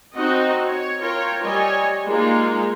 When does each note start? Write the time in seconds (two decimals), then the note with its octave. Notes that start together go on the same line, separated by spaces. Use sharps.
0.15 C4 D#4 F#4 D#5
0.68 C#5
1.00 F4 A#4 C#5 G5
1.42 G3 C#5 D#5 G#5
2.07 G#3 A#3 D#4 F4